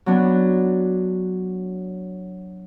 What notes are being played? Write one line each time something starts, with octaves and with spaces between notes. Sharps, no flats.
F#3 B3 D4